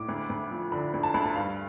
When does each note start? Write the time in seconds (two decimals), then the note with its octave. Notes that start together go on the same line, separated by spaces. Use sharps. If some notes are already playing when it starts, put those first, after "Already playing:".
Already playing: A2 D6
0.08 D2
0.30 D2
0.51 F3
0.72 D3 B5
0.94 D2
1.03 A5
1.14 D2 B5
1.24 A5
1.35 G2 F5